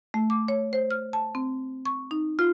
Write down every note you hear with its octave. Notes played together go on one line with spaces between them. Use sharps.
A3
D6
C#5
C5
F6
A5
C4
C#6
D#4
F4